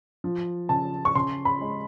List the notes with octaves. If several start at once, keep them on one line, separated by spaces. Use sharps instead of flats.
F3
C#3 A5
C#6
C#3 C6
B5
G#3